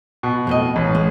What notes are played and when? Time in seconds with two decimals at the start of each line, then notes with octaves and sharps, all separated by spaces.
0.23 B2
0.47 F2 A2 D#5
0.76 A1
0.95 G#3